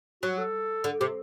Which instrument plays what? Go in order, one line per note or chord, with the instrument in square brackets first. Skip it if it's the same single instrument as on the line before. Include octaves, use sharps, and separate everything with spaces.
[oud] F#3 [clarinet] F#4
[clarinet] A4
[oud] D3
[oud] C3 [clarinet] G4